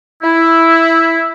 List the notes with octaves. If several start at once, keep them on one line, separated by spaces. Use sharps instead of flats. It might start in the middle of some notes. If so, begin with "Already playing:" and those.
E4